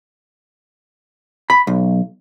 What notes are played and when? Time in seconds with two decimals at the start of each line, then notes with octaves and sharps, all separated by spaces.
1.50 B5
1.67 B1